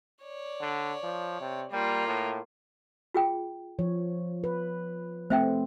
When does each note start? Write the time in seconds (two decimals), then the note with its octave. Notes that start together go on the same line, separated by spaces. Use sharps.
0.23 C#5 D5
0.61 D3
1.03 F3
1.41 C3
1.71 G3 A#3 F4
2.07 A2
3.14 F4 G#4 G5
3.79 F3 C#5
4.44 B4
5.30 A3 C4 C5 E5 G5